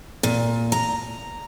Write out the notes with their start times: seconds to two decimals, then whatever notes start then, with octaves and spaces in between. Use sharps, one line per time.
0.23 A#2
0.72 A#5